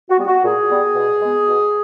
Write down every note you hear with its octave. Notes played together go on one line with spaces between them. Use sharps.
F#4
G3 B3
F#4
A#2 G#4
G3 B3
B2
G#3 B3
B2